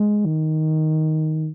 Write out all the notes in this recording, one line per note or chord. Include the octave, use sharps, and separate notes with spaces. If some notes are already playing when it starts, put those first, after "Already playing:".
Already playing: G#3
D#3